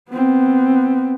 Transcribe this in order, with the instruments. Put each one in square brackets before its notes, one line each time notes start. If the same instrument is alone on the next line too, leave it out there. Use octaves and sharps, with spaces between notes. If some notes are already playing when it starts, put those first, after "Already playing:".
[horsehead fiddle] B3 C4